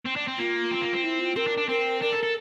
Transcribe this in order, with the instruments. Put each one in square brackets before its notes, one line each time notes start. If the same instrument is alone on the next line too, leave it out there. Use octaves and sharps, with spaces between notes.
[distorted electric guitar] C4
D4
C4
[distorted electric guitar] A#3 [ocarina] F4
[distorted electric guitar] C4
A#3
C4
[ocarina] E4
F4
[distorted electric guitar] C4 [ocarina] A#4
[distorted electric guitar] D4
D4
[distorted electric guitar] C4 [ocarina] A#4
[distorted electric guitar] D4 [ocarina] A#4
[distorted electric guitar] A4
A4